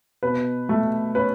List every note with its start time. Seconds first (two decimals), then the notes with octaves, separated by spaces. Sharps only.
0.23 B2 B4
0.69 A3
1.15 C#4 B4